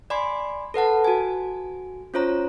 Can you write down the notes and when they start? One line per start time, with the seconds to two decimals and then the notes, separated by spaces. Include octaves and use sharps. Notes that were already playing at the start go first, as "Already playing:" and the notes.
0.10 D5 G#5 B5 C6
0.74 A4 B4 F#5 A5
1.05 F#4 G#5
2.14 C#4 F4 C5 C#5 A#5